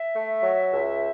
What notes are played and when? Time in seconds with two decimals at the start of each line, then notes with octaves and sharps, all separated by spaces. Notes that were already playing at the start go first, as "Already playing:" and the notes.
Already playing: E5
0.13 A3
0.43 F#3
0.71 C#2